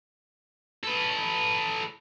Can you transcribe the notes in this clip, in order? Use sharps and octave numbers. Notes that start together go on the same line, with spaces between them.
A4 B4